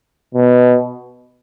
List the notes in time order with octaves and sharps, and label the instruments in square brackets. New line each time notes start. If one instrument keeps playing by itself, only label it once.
[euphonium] B2